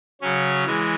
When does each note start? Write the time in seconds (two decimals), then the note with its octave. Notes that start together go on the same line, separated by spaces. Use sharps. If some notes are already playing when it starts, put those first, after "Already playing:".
0.21 C#3 F#3 C#4
0.65 E3 G#3